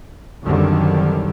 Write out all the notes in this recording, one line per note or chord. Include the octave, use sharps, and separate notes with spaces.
C2 F#2 D3 D#3 F#3 G3